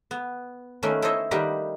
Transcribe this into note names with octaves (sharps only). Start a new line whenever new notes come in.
B3
D#3 A3 A#3 C#4 B4
E4 A4 C5 C#5 D#5 E5
D#3 G3 A#3 D#4 G4 B4